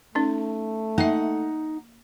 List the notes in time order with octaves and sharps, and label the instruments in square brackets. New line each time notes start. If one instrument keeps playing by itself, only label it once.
[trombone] A3 [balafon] C#4 D#4
[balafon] A#3 E5 [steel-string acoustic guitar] D#4 F#5